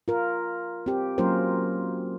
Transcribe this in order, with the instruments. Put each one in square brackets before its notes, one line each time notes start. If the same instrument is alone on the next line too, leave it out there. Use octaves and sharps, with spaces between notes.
[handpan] F4 A#4
C4 G4
F#3 A#3 C#4 F4 A#4 C5